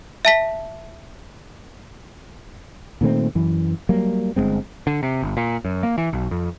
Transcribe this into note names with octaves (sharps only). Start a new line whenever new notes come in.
E5 A5 B6
A#2 D#3 A3 C4
F#2 E3
F#3 G3 A#3
G1 G#2 G#3 C4
D3
C3
G1
A#2
F#2
A#3
E3
B1
F2